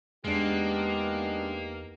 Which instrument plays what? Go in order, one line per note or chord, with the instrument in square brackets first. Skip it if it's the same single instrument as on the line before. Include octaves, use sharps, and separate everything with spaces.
[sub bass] E2 [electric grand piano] G#3 D4 [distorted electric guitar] A#3 [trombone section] B3 D#4 G4